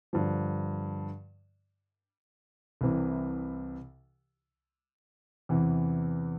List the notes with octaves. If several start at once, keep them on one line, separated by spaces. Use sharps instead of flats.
G2 D3 F3
C2 C3 E3
E2 C3 E3